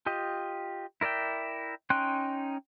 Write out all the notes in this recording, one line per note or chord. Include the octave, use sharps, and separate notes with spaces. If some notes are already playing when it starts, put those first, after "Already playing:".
F4 G4 D#5
E4 A#4 D5 E5 G5
C#4 D#4 G5 C6 F#6